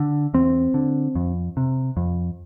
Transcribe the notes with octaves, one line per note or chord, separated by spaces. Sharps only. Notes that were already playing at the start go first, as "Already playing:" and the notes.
Already playing: D3
E2 C4
D3
F2
C3
F2